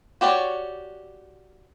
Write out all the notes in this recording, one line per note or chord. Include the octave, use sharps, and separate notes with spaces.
F#4 G4 C#5 D5